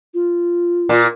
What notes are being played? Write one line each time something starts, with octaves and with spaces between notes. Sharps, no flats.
F4
A#2